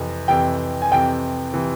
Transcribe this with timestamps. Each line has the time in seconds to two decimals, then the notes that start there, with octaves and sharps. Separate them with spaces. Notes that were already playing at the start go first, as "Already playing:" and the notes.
Already playing: F2 C3 E3
0.28 F2 C3 E3 G5
0.82 G#5
0.91 F2 C3 E3 G5
1.54 C3 E3